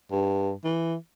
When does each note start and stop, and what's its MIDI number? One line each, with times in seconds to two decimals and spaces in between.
0.11 0.52 43
0.64 0.95 52